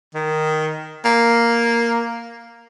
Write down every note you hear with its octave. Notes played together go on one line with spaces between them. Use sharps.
D#3
A#3